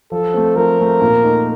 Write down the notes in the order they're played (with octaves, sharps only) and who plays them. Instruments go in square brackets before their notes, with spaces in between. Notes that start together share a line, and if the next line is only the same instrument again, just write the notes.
[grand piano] F3 [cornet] A4
[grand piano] A3 C4
[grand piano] F3 [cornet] A#4
[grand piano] A3 C4
A#2
A3 D#4